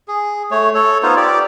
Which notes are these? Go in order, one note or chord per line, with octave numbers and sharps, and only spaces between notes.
G#4
A3 C#5
A4 C#5
B3 D#4 F4 C5
G4 D5